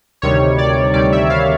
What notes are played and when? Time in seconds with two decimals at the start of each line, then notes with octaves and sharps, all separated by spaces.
0.22 D2 C3 D#3 G3 C#5
0.58 D5
0.94 D2 C3 D#3 G3 D5
1.12 E5
1.30 F5